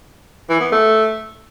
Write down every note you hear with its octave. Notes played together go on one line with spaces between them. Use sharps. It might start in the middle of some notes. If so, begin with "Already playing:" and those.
E3
B3
A3